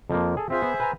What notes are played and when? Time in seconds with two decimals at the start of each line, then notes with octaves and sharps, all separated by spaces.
0.10 F2 F3 A#3
0.37 G#4 A4
0.50 C4 F4 G#4 C5 E5
0.62 B3
0.80 B4 G#5 A#5